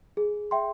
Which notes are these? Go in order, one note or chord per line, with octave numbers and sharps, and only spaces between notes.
G#4
E5 G5 C6